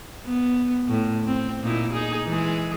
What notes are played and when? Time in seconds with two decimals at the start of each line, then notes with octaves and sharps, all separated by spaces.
0.25 B3
0.88 A2
1.27 C4
1.62 A#2 D#4 E4
1.93 D#4 G#4
2.25 E3 G#3 G#4